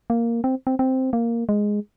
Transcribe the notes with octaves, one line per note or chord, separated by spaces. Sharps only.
A#3
C4
C4
C4
A#3
G#3